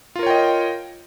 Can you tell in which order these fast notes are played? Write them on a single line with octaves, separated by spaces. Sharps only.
F4 A#4 C#5 G5 D#5